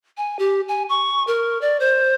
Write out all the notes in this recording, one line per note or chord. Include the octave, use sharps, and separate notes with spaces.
G#5
G4
G#5
C#6
A#4
D5
C5